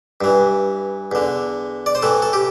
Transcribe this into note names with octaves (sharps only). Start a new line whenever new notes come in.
G2 E3
E2 D3
D5
C5
A2 E3 A4
A4
G4